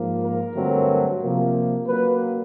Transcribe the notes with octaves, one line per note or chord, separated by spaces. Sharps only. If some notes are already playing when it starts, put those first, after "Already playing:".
Already playing: G#2 F3 A#3
A#4
G2 D3 F#3 A3 C4
C3 F3 A#3
C#3 F#3 A#3 B4